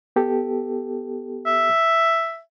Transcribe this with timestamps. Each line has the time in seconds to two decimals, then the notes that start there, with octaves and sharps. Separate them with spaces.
0.16 B3 G4 A4
1.47 E5